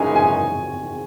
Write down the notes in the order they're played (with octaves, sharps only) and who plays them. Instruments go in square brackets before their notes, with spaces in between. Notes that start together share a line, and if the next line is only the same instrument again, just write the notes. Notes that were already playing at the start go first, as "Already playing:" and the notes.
Already playing: [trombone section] F#2 C#3 E3 G#3 D#4 [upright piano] G#5
[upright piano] G#5